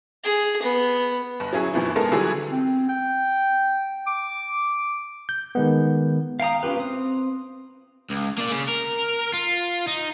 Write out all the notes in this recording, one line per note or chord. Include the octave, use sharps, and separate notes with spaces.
G#4
B3
G1
F#3 C#4 E4 G#4
F#2 B2 E3 F3
G#3 B3 A4 A#4
D3 E3 F#3 G3 G#4
C4
G5
D6
G6
D#3 G#3 B3
F5 G5 A#5 D#6
C#4 F4 G4 B4
C4 D#6
C#2
A#3 D5
C#3
A#4
F4
D#4